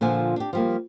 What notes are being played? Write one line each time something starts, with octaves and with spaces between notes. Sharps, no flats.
A#2 D3 F3 G#5
D4 G4
F3 G3 A#3